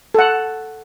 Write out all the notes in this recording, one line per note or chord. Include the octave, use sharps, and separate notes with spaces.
A4 F#5